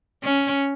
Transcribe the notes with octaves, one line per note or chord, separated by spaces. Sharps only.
C#4